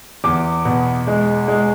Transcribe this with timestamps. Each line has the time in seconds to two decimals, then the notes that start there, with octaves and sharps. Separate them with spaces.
0.24 E2 D6
0.65 B2
1.07 G#3
1.48 G#3